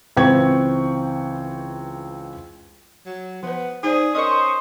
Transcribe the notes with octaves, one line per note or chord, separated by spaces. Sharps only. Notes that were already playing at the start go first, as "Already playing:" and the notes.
C#2 E3 C4 G5 C#6 G#6
F#3
F3 B3 B4
D#4 G#4 C5 D5
C#4 A#4 C5 D#5 C#6 D#6